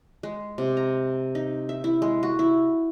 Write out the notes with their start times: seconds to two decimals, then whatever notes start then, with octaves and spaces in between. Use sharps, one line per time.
0.23 G#3
0.58 C3
0.77 A#5
1.35 D#4
1.69 E5
1.84 E4
2.02 G#3
2.23 F#4
2.39 E4